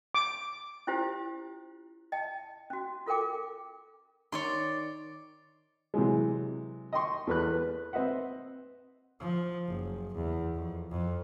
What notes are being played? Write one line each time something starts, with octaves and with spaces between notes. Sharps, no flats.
D6
C#4 E4 F4 G4 C5
D#5 G5 A5
C#4 F#4
F4 A4 A#4 G5 D6
D#3 C#5 D5 C6
C3 E3 F#3 G#3
D#5 G5 C6 C#6
E2 A4 B4 B5 F#6
B4
C4 B4 D#5 E5 F#5
F3
F#1
E2
F2
F2